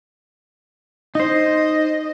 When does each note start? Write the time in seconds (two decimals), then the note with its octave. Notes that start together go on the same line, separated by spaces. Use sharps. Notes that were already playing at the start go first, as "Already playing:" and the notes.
1.15 D#4 C5 D#5